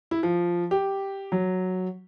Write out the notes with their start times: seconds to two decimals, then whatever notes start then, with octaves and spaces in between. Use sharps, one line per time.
0.11 E4
0.23 F3
0.71 G4
1.32 F#3